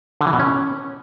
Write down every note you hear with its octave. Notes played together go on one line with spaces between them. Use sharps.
D3
E3
B2
C#4